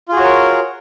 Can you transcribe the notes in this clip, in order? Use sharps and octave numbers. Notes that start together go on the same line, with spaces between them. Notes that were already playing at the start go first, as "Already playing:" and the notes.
F4 F#4 G#4 A#4 C#5